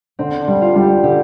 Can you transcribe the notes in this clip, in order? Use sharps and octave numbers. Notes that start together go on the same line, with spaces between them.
D3 C4
D4
G3
F4
G3
G4
D3 G4